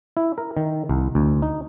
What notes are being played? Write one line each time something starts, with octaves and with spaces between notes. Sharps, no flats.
E4
A#4
D#3
C2
D2
D#4